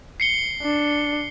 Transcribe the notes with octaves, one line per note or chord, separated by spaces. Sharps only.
C7 C#7 G7
D4